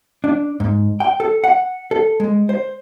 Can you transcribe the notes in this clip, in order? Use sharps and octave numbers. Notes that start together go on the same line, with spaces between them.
D4
G#2
G5
A4
F#5
A4
G#3
C5